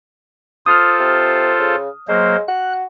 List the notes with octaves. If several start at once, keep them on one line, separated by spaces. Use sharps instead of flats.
F4 A4 C5 D#6 F6
C3
C#3
F#3 G#3 A#3 C5
F#4 F#6